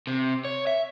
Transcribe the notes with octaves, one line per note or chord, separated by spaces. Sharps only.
C3
C#5
E5